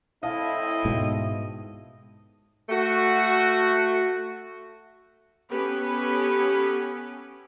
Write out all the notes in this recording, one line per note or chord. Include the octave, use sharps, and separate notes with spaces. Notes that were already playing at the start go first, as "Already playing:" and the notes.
A2 C4 E4 D#5 F5 A5
G#2 B2
A3 F#4
B3 C#4 G4 A4 B4